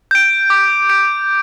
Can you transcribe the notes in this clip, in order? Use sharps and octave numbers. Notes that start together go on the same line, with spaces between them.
G6 D7
D6
G6 D7